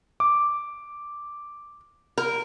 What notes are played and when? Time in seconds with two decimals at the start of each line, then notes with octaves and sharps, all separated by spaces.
0.20 D6
2.18 A#4